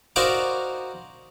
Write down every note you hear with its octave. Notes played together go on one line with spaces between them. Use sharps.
D#4 F#4 A#4 C5 D5 F5